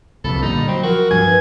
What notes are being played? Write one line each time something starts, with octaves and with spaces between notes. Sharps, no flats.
C2 F2 E3 A4 B5
A#2 D3 G3 D#4
F#3 C4
F3 F#4 A#4
G2 F#3 G#5
B4